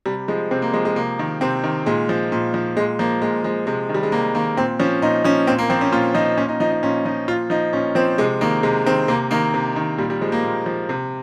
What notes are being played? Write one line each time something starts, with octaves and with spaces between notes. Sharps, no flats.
C3 G3
F3 G#3
C3 C4
A#3
F3 G#3
G#3
C3 A#3
D#3
C3 C4
D#3
A#2 G#3
F3
A#2
F3
A#2 G#3
F3 A#3
A#2 G#3
F3 G#3
C3 G#3
D#3
G3
G#3
C3 A#3
D#3 A#3
A#2 C4
F3 C#4
A#2 D#4
F3 C#4
A#2 C4
A#3
F3 C4
C#4
A#2 F4
F3 D#4
A#2 C#4
D#4
F3 D#4
D#4
A#2 C#4
F3 D#4
A#2 F4
F3 D#4
A#2 C#4
F3 C4
C3 G#3
D#3 A#3
C3 G#3
D#3 C4
C3 A#3
D#3 A#3
C3
D#3
A#2 G3
G3
F3 G#3
A#3
A#2
F3
C3